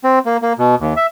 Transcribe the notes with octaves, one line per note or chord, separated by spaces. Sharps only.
C4
A#3
A#3
B2
D#2
E5